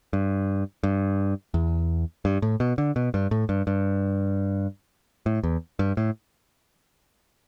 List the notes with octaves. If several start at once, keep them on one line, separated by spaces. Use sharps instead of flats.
G2
G2
E2
G2
A2
B2
D3
B2
G2
A2
G2
G2
A2
E2
G2
A2